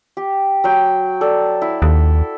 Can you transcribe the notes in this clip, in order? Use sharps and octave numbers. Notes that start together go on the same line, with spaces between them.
G4
F#3 G5
A4 D5
E4
D#2 A4